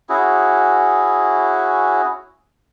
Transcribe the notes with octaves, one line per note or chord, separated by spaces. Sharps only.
C#4 E4 F#4 G#4